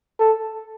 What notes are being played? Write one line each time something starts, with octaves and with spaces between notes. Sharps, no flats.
A4